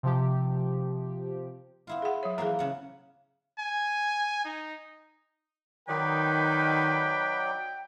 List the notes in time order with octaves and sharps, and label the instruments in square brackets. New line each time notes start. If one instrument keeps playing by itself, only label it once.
[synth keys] C3 F3 G4
[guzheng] B3 E4 F4
[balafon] G#4 F#5
F#3 C#5
[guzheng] E3 F3 A#3 [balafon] G#4 A#5
[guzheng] C#3 F#5
[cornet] G#5
D#4
[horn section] D#3 [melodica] F#3 D#4 D5 [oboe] B4 [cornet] G5